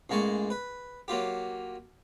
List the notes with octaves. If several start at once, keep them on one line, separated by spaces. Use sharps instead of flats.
A1 G#3 A#3 G#5 A5 C#6
B4
F#3 A#3 F4 G4